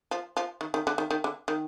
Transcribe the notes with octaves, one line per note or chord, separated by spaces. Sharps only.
F3
F3
D#3
D#3
D3
D#3
D#3
D3
D#3